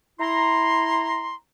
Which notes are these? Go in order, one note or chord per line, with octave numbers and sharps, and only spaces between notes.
E4 A#5 C6